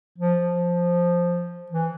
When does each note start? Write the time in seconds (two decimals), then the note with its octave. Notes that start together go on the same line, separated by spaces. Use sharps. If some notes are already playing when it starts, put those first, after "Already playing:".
0.18 F3
1.72 E3